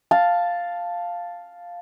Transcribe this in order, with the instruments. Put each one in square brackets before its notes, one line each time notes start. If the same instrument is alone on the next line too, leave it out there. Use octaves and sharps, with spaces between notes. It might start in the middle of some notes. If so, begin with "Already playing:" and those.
[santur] F5 A5